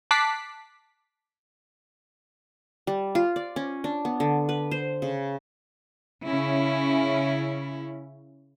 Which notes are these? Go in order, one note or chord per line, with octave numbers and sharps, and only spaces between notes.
A5 D6 F#6 B6 C7
G3
F4
D5
C#4
D4
B3
D3
B4
C5
C#3
C#3 C#4 E4